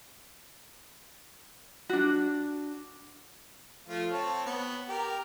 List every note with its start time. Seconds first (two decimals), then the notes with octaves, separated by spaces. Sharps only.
1.89 D4 F#4
3.88 F3 A3 F4
4.12 C4 C#5 A5
4.46 B3
4.89 G4 A#4